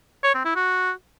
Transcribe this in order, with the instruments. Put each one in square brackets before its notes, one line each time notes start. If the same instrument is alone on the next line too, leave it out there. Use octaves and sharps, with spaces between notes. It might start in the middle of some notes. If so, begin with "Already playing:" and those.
[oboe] C#5
C4
E4
F#4